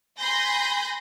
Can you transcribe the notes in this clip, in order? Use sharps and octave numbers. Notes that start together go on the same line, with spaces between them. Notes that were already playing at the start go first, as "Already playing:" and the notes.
G#5 B5 C6 G6 A#6